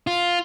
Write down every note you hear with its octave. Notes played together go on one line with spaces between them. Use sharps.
F4